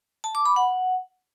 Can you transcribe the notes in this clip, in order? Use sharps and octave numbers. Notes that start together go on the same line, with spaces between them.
A5
D6
B5
F#5